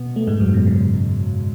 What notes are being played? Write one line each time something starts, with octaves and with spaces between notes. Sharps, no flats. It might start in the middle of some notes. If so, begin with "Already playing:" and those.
Already playing: B2 B3
A3
G#2 G#3
F#2 F#3
B2
C#3